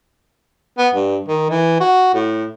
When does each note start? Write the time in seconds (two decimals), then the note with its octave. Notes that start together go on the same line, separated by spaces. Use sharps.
0.78 B3
0.94 G2
1.28 D#3
1.50 E3
1.80 F#4
2.14 A2